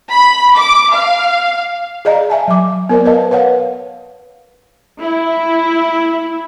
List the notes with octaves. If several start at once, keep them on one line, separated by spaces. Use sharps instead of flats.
B5
D6
F5
G#4 D5 D#5 F5 A#5
E5 G#5 A5
F#3 D6
B3 A#4 C5 D5
A#4 B4 D#5 F5 A5
B4 C#5 F5 F#5
E4